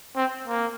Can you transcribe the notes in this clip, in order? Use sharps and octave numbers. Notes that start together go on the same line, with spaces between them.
C4
A#3